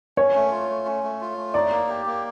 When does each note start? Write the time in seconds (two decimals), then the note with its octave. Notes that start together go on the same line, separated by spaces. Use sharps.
0.17 C#4 C#5
0.35 A3
0.51 F4
0.69 A3
0.86 C#4
1.03 A3
1.21 F4
1.37 A3
1.54 D#4 D5
1.71 A#3
1.89 G4
2.06 A#3